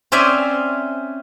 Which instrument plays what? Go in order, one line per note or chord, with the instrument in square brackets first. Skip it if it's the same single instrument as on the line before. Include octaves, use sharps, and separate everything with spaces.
[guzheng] C4 C#4 C5 D5 E5 G#5